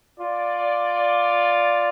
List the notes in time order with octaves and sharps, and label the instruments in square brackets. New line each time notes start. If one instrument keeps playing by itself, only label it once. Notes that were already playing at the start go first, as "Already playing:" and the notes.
[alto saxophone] F4 [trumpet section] D5